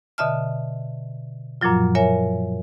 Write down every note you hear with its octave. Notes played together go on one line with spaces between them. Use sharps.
B2 D3 D#5 E5 A5 F6
F#2 A#2 F3 F#3 F4
A#4 C#5 E5 G#5